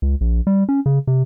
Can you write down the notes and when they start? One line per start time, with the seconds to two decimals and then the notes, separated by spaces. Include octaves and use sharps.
0.02 C#2
0.21 A#1
0.47 G3
0.69 C#4
0.86 C#3
1.07 C3